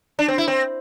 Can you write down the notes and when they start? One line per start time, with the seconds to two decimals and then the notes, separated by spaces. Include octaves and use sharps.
0.19 D4
0.28 C4
0.38 E4
0.48 C4